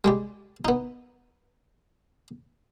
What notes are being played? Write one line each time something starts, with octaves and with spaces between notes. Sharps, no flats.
G3 G#3 G4
B3 D#4